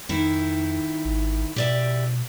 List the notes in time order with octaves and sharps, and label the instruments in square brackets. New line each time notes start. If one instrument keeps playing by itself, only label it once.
[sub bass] F2 [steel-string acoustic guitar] D#3 E4
[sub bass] G#1
[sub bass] B2 [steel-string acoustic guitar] G4 D5 E5